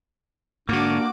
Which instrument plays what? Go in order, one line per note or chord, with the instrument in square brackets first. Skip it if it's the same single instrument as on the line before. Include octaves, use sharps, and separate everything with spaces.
[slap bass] G#2 D3 [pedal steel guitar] A#3 [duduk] D4 [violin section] F#4 D6